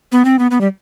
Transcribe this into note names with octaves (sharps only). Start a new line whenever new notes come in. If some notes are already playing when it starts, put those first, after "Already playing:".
B3
C4
B3
B3
G3